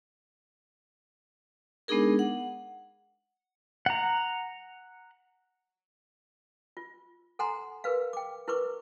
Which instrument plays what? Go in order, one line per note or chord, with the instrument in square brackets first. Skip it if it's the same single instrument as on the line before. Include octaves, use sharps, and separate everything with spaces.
[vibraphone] G#3 B3 D4 D#4 G#4 A#4
F#5
[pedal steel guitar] F#5 A#5
[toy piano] F4
A4 F#5 G#5 A#5 C6
G#4 A#4 B4 F5
G5 D6
E4 A#4 B4 C#6 D6